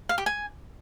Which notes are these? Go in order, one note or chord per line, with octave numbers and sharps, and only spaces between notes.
F5
G4
G#5